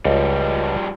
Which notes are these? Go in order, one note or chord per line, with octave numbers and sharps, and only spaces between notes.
C#2 F3 G3